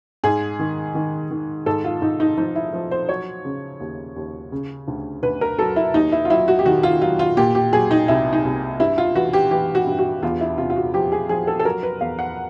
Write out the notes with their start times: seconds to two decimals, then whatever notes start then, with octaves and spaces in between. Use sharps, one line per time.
0.24 G#2 G#4
0.59 D#3
0.95 D#3
1.31 D#3
1.66 G#2 A4
1.84 F4
2.01 G#2 D#4
2.20 D#4
2.37 F3 D#4
2.56 E4
2.73 F3
2.91 C5
3.09 F#3 C#5
3.45 C#3
3.80 D#2
4.16 D#2
4.52 C#3
4.88 D2
5.23 D2 B4
5.41 A#4
5.59 F#3 A4
5.76 E4
5.94 D#2 D#4
6.12 E4
6.25 F4
6.30 F#3 E4
6.48 F#4
6.59 G4
6.66 D#3 F#4
6.83 F4
7.01 F#3 F4
7.19 F4
7.37 A#2 G4
7.55 G4
7.73 F#3 G#4
7.91 D#4
8.08 C2 E4
8.33 D#4
8.44 C2
8.80 G2 E4
8.98 F4
9.15 E3 F#4
9.33 G4
9.51 E3 G4
9.75 F#4
9.87 G2
9.99 F#4
10.23 E2 F4
10.41 E4
10.58 C3 F4
10.70 F4
10.76 F#4
10.94 F3 G4
11.12 G#4
11.29 F3 G#4
11.47 A4
11.59 A4
11.65 F#3 A#4
11.83 B4
12.01 E2 F5
12.19 F#5